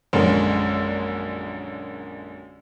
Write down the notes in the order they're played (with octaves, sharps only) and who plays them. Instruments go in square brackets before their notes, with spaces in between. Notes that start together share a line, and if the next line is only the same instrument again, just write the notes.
[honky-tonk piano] A#1 F#2 D3 G#3